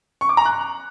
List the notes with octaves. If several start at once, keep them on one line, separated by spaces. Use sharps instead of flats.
C#6
D6
A#5
F#6